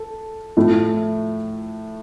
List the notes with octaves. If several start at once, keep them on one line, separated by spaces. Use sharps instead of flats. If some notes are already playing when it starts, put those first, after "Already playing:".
Already playing: A4
A2 F3 A3